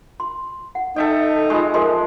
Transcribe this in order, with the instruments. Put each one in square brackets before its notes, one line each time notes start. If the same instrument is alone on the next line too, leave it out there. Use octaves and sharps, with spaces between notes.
[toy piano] C6
F#5
[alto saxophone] D#4 [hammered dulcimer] A4 E5 G5
[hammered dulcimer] G#3 [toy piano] F4 C#6
[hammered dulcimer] F3 G#3 [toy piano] G#4 A#4 C6